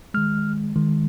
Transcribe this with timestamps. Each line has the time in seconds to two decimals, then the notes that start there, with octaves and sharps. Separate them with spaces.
0.14 D#3 G#3 F6
0.76 D#3 G#3